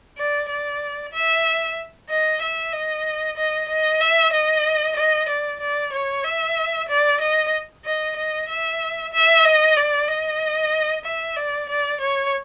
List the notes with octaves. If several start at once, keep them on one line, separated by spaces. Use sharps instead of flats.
D5
D5
E5
D#5
E5
D#5
D#5
D#5
E5
D#5
D#5
D5
D5
C#5
E5
D5
D#5
D#5
D#5
E5
E5
D#5
D5
D#5
E5
D5
D5
C#5